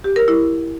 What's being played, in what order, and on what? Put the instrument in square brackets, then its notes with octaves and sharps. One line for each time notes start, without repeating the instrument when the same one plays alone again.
[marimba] G4
A#4
E4